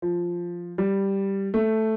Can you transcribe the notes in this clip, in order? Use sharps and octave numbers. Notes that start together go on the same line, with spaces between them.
F3
G3
A3